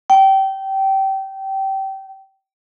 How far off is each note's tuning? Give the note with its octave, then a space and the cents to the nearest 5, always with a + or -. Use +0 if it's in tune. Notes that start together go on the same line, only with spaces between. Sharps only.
G5 -20